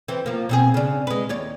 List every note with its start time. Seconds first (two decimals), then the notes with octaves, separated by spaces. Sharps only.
0.08 E3 C4
0.26 F3 A#3
0.49 B2 C4 G#4
0.74 C#3 D4
1.07 G#3 B4
1.29 D#2 C#5 D5